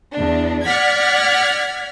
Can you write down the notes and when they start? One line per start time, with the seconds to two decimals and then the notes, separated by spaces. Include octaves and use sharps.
0.14 E2 D4
0.66 D5 F#5 F6 G#6 B6